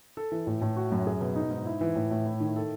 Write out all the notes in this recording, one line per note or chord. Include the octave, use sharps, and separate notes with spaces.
A4
E3
A2
A2
F#4
F#2
G#4
B2
D#4
G#2
E4
E3
A2
A2
E4
D#3
A4